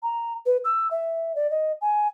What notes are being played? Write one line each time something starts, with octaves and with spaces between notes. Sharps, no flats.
A#5
B4
E6
E5
D5
D#5
G#5